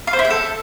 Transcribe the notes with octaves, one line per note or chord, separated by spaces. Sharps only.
F5
C5
E4
G5
A4